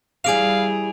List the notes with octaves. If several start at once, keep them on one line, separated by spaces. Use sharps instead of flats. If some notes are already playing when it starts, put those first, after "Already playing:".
E3 G3 G#4 F5 G#5 D7 F7